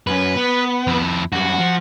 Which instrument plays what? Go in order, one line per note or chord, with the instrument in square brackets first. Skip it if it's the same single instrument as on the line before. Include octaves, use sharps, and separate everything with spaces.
[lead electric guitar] F#2 C#4 [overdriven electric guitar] B4
[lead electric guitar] B3
[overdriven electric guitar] F2 E4
[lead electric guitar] F#2 G3 [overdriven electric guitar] F#4
[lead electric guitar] F3